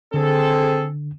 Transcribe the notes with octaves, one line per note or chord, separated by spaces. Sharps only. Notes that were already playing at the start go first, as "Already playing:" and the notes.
D3 C4 G#4 A4